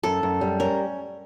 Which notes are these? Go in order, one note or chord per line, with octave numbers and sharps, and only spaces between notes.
F#2 A4
F#2
G3
C#4 A#4